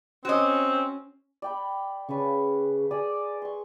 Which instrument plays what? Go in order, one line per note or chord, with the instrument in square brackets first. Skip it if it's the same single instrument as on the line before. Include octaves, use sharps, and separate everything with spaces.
[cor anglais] C4 [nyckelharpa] C#4 [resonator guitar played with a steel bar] F#4 D#5
[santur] D5 G5 B5
[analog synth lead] C#3 [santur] B4 A5 C#6
[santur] G#4 D#6 [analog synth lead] D5
[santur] C6 C#6